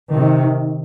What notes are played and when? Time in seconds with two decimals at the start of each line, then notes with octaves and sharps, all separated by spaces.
0.15 C3 D#3